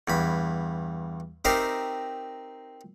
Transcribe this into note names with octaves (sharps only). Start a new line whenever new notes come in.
E2 G2 B5
C4 D#4 G4 A#4 C5 E5